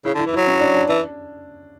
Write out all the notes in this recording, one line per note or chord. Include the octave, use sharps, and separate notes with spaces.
C#3 E4
D3 E4
E3
E4
F#3
C#4
D4
D4
E3 D4